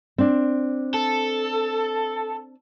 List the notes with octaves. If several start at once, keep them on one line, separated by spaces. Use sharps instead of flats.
C4 D4
A4